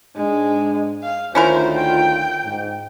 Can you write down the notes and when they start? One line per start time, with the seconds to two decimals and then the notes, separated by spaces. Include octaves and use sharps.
0.16 G#2 G#3 D4
1.03 F5
1.35 D2 D#3 C#4 E4 F4 A#4 C5
1.75 G5
2.44 G#2